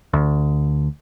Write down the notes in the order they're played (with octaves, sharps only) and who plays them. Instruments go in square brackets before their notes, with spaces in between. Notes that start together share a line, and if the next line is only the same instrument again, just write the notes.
[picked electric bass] D2